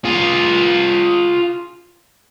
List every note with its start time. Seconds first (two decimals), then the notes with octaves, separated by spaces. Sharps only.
0.05 F4 G#4